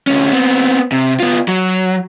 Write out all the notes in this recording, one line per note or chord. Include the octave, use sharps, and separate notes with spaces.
D2 C#4
B3 C4
C3
B3 F4
F#3